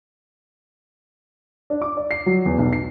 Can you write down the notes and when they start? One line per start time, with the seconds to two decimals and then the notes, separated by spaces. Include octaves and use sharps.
1.70 D4
1.82 D6
1.97 D5
2.11 C7
2.26 F#3
2.46 E2
2.58 B1
2.73 C7